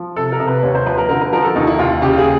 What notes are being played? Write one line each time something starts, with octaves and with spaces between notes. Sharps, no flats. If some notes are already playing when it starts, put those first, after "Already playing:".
Already playing: F3
C3 A4
A#4
C3
B4
D#2 C#5
C5
F3 B4
A#4
D3 A#4
B4
F3 A#4
A4
D#2 D#4
E4
D#2 F4
C#3 G4
G#4